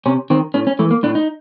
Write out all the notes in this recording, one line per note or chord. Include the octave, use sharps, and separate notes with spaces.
C3 C#4
D#3 C4
A2 C#4
C#4
E3 A3
A#3
A2 D4
D#4